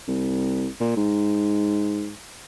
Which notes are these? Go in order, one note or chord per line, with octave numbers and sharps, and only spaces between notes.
C2
A#2
G#2